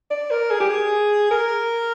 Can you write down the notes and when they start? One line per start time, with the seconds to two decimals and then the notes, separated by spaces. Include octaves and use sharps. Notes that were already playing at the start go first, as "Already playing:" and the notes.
0.10 D5
0.31 A#4
0.51 G#4
0.60 G4
0.69 G#4
1.31 A#4